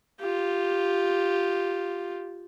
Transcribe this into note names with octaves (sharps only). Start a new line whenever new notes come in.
F4 G4